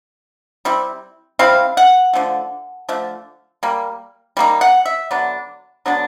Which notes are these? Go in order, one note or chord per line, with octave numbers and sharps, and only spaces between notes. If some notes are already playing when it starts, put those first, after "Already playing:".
G3 C4 E4
G3 C4 E4 F5
F#5
D3 F3 A3
D3 F3 A3
G3 A#3
G3 A#3 D#4
F#5
E5
D3 F#3 B3 D4
D3 F#3 B3 D4